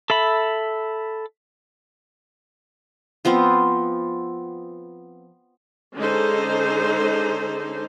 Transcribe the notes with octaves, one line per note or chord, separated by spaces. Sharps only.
A4 E5 B5
F3 B3 C4 F4
D3 G#3 C#4 D#4 A4 C5